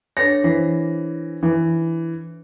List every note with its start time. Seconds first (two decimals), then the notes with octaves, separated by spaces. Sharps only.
0.17 D4 A4 C#5 A#6
0.44 E3 B4 C5
1.43 E3